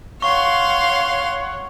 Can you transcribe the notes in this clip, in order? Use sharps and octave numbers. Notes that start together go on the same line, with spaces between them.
C#5 F5 F#5 C6 C#6